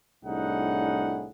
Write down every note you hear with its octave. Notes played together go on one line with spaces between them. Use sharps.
C2 A2 D4 D#4 G#4 F#5